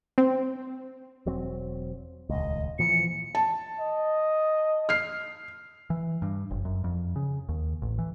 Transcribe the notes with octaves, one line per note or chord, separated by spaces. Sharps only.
C4
E1 F#3 C4
D#1 C#2 D#5
A#2 E3 F3 C#7
A5
D#5
F6 C7
E3
G2
F#1
F#2
F2
C#3
D#2
A1
E3